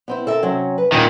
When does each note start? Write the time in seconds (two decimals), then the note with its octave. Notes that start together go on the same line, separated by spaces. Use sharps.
0.08 B3 C4 E4
0.27 A4 A#4 E5
0.43 C3 F#3 C#4
0.78 B4
0.92 D#2 A#2 D#3 G5